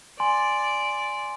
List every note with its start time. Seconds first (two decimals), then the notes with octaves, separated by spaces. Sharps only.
0.20 D5 G#5 C6